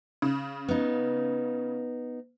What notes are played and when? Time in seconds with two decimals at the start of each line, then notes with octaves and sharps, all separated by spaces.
0.22 C#3
0.69 B3 D#4